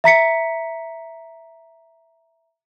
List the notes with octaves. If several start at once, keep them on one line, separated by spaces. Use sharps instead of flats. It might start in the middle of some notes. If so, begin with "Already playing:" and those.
E5 A#5 B6 C#7